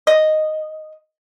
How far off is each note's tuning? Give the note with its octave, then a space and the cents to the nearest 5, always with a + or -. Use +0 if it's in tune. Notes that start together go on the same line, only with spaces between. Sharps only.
D#5 -5